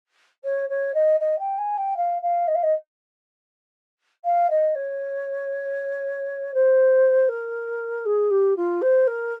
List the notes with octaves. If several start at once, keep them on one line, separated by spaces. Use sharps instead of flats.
C#5
C#5
D#5
D#5
G5
G#5
G5
F5
F5
D#5
F5
D#5
F5
D#5
C#5
C5
A#4
G#4
G4
F4
C5
A#4